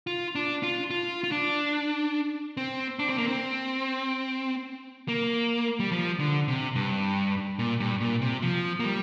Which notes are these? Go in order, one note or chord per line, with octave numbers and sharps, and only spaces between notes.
F4
D4
F4
F4
F4
D4
C4
D4
C4
A#3
C4
A#3
G3
F3
D3
C3
G2
A#2
G2
A#2
C3
F3
A#3
G3